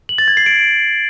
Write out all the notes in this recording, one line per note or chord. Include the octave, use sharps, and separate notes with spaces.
F#7
A6
G#6
C7
D7